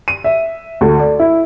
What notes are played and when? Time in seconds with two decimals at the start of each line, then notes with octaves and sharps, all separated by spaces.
0.08 D#7
0.24 E5
0.81 D2
0.99 D5
1.20 E4